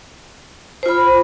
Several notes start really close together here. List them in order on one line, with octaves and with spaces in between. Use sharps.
C5 F4 B5